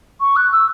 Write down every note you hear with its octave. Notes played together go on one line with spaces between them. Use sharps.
C#6
F#6
E6